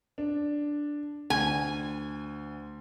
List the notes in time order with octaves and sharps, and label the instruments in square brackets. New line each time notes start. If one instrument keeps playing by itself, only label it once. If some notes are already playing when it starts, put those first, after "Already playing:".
[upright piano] D4
[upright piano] D2 [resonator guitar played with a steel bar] G#5